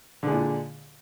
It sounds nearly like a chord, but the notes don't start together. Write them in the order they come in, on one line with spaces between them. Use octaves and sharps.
D3 G#3 A#2